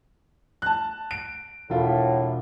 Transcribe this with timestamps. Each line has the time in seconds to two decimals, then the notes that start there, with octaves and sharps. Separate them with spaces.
0.62 A5 F#6
1.11 D7
1.70 E1 A2 F4